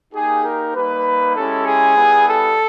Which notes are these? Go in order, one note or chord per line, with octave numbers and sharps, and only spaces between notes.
A#3 D#4 G4 G#4
A#4
G3 A#3 D#4 B4
G#3 C#4 E4 G4 A4
G#4
G3 B3 E4
A4